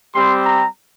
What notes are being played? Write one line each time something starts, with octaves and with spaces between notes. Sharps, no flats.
G3 C4 G4 C6
A#5